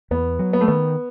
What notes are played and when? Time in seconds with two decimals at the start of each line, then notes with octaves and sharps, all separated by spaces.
0.11 E2 B3
0.39 F#3
0.53 B3
0.61 A3
0.68 D#3 B3